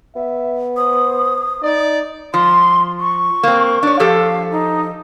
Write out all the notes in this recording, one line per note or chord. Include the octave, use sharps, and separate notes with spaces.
B3 E5
C5 D#6
D#4 D5
F3 C6
C#6
A#3 C4
D4 C#5
F3 G4 A4 F5
D#4